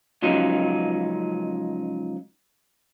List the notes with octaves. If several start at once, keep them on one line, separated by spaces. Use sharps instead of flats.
C#2 F3 F#3 C#4 D#4